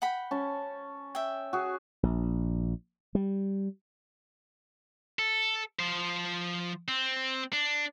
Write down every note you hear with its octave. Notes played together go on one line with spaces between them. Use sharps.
F#5 G5 B5
C#4 A5
E5 G5
F#4 G#4
A#1
G3
A4
F3 C5
C4
D4